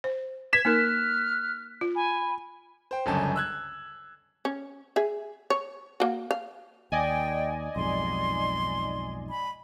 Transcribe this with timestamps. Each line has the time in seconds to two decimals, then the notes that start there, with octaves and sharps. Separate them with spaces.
0.04 C5
0.53 B4 G#6 B6 E7
0.65 A#3 D#4 A#4 F6 F#6
1.81 F4
1.95 G#5 B5
2.91 C5 G5
3.06 G1 C#2 F#2 C#5 A5
3.36 E6 F#6 G#6
4.45 C#4
4.96 G#4 E5
5.50 C#5
6.00 A#3 F#4
6.31 F5
6.92 D#2 D5 D#5 G5 G#5
7.76 B1 F2 G#2 C6
9.30 B5